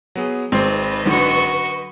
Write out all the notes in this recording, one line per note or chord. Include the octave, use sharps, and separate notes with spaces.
F#3 B3 G#4
G#1 G#3 C4 B4 C5 D#5
F#2 D3 F#4 C#6